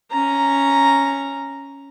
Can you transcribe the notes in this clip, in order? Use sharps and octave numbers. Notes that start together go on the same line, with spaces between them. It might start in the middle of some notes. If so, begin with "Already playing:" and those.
C#4 A#5